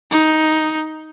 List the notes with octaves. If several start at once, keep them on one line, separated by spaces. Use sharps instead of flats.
D#4